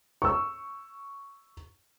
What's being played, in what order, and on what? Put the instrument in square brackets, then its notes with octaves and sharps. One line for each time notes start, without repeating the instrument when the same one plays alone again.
[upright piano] C#6 E6